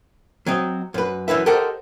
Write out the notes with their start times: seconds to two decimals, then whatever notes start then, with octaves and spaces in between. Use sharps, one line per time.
0.46 F#3 C4 D#5
0.94 F#2 B4
1.28 F#2 E3 B4 E5
1.46 G4 A4 A#4 C5 D#5 F#5